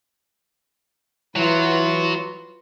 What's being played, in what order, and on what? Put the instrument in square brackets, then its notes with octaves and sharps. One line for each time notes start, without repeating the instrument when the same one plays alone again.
[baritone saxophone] E3 [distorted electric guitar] F#3 [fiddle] F4 B4